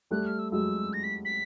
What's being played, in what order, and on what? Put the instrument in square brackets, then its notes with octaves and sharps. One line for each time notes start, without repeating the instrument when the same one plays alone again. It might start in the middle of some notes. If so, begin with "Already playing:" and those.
[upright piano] G3 A3 [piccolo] F#6
[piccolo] F6
E6
[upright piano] F#3 G#3 [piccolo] E6
[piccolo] A#6
B6
B6